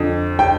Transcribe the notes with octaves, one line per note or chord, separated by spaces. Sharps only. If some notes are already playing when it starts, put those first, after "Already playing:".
Already playing: F2 D3
G5